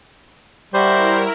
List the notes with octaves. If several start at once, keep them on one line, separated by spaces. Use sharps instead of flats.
G3 E4 F#4 A#4 C5 E5